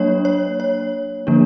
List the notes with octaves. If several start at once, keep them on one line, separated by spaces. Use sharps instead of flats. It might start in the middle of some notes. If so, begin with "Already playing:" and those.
Already playing: F#3 A#3 D4 C#5
C#5
C#5
D3 F3 A#3 D4